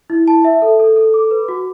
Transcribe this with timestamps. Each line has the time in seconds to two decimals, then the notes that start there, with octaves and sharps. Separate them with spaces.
0.10 E4
0.28 A5
0.44 E5
0.62 A4
0.80 A4
0.96 A4
1.14 D6
1.31 B4
1.48 F#4